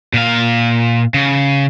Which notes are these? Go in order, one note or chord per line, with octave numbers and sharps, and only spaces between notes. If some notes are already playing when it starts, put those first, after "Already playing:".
A#2 F5
C#3